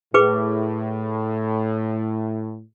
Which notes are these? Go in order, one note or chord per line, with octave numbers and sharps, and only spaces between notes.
A2 G#4 B4 D6